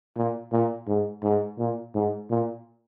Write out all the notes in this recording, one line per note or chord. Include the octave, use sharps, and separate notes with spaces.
A#2
A#2
G#2
G#2
A#2
G#2
A#2